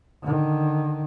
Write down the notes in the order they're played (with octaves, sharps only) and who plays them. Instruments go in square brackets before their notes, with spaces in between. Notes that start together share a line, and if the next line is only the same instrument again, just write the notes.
[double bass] D3 D#3